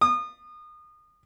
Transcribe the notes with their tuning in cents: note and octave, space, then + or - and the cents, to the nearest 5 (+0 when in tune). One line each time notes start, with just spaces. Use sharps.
D#6 -30